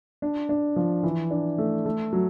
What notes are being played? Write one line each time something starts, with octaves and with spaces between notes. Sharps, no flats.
D4
D4
F3
E3
D4
A3
A3
F#3